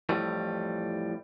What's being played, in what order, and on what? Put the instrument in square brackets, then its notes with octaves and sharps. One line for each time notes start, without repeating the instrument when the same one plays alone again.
[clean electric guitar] F2 A2 E3 G3